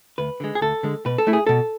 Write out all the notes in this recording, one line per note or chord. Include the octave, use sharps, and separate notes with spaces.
D2 B4
D3 G#3
G#4
D2 A4
D3 G#3
B2 B4
A4
A3 E4
G#4
B2 A4